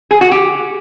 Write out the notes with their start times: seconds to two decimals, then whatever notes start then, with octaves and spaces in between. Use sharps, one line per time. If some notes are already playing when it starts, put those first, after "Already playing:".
0.11 G#4
0.21 F#4
0.31 G4